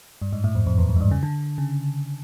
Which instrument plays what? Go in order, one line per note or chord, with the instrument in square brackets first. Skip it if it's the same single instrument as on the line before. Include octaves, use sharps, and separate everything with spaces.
[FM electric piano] G2
G#2
A2
F2
F2
E2
F2
G#2
G2
C#3
D3
C#3